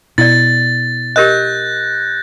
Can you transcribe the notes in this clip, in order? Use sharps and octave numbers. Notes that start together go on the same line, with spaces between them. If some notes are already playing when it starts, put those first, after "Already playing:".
B2 E4 D5 A6
G4 A#4 D#5 F#6 G6 A#6